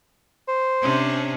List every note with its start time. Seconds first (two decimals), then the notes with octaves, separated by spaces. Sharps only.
0.48 C5
0.82 C3 C#4 D4